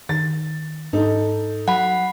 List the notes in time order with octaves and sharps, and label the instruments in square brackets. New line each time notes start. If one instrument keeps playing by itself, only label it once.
[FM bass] D#3 [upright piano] A6
[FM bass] G#2 [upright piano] D#4 A4
[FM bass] F#3 [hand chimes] F#5 B5